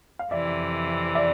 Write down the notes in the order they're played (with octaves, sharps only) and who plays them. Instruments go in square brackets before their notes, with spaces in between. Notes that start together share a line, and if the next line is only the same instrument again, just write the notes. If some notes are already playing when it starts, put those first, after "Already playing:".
[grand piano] F5
[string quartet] F2 C3 E3 [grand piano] D5 E5
[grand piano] D5 E5